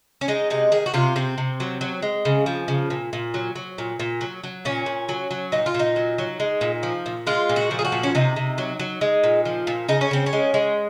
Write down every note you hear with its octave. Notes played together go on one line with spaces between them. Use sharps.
C#4
G#3 D#4
C3 D#4
D#3 G#4
F#4
C3 F4
C3 C4
C3
F#3
F#3
G#3
C#3
F3
C#3
A#2
A#2
F#3
F#3
A#2
A#2
F#3
F#3
A#2 C#4
A#2
F#3
F#3
A#2 D#4
F4
A#2
D#4
F#3
F#3
G#3
A#2
F3
A#2
G#3 F4
A#2
F#4
F3
G#4
F#4
A#2
C#4
C3 D#4
C3
F#3
F#3
G#3
A#2
F3
A#2
C#3 D#4
C#4
C#3 C4
C#4
G#3
G#3